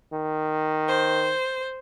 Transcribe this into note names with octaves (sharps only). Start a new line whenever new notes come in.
D#3
C5